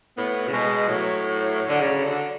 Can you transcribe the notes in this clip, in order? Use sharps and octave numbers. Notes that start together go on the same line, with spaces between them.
A2 B3
C#3
B2 G#3
A2 F#3
D3
C#3
D3